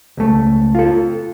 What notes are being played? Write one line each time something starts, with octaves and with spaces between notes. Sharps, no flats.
C#2 A3
F4 A4